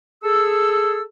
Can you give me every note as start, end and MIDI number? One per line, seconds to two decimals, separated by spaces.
0.23 1.02 68
0.23 1.02 69
0.23 1.02 88